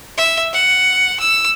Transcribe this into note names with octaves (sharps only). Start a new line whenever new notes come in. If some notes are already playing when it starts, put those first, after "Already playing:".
E5
F#5
E6